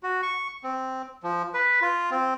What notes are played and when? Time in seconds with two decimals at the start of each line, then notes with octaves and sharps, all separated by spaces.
0.03 F#4
0.23 C#6
0.64 C4
1.23 F3
1.54 B4
1.81 F4
2.11 C4